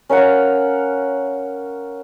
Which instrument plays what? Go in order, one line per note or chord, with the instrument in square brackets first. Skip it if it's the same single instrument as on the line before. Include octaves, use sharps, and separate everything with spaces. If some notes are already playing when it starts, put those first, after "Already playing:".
[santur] C#4 A#4 F5 F#5